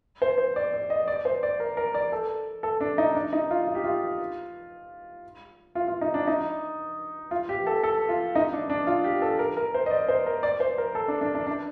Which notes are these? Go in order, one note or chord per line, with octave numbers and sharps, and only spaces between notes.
C5
C5
D5
D5
D#5
D5
C5
D5
A#4
A#4
D5
A4
A4
D4
D#4
D4
D#4
F4
F4
G4
F4
F4
F4
D#4
D4
D#4
F4
G4
A4
A4
F4
D#4
D4
D4
F4
G4
A4
A#4
A#4
C5
D#5
D5
C5
A#4
D5
C5
A#4
A4
D4
D4
D4
D4